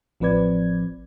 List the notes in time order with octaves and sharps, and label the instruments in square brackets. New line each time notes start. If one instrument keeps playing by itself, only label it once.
[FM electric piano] A1 F3 C4 B4 D5 G#6